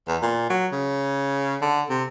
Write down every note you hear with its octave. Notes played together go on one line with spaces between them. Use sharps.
E2
A#2
F#3
C#3
D3
C3